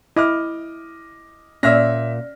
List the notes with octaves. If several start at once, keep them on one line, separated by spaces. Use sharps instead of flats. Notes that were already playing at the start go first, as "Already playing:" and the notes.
E4 D#5 D6 F6
A#2 C#4 E5 E6 F6 A#6